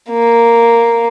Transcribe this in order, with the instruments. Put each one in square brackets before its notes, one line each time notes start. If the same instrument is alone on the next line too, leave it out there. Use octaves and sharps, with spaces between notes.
[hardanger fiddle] A#3